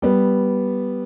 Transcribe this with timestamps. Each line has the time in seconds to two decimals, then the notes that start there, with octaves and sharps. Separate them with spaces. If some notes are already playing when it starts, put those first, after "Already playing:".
0.02 G3 B3